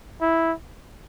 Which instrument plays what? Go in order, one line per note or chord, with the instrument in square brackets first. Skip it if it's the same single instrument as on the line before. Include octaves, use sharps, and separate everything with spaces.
[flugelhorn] E4